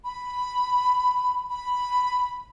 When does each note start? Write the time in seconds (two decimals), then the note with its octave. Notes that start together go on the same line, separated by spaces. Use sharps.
0.05 B5
1.50 B5